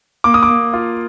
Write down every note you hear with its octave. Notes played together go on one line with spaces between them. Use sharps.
A#3 D6
D#6
D6
A#3
F4